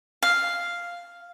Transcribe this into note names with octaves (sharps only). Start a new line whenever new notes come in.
F5